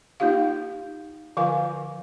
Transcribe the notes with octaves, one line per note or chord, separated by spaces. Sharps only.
A#3 D#4 F4 G4 F5
D3 F3 F4 A#4 F5 G#5